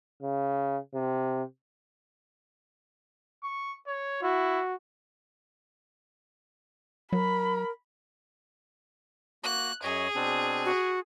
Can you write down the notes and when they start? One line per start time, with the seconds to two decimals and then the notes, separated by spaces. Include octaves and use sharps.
0.22 C#3
0.94 C3
3.43 C#6
3.87 C#5
4.23 E4 F#4
7.13 F#3 A#4 B5
9.44 A#3 F#4 F#6
9.83 F#2 G#4 C#5 D#5
10.15 B2 C4 D4
10.65 F#4